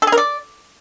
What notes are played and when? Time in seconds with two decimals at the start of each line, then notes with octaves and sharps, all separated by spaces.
0.02 A4
0.07 G#4
0.12 A#4
0.18 D5